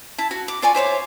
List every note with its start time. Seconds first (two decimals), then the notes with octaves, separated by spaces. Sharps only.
0.18 E4 A5
0.31 F#4
0.48 D6
0.62 F4 D5 G#5 C#6
0.75 E4 C5 C#5 D6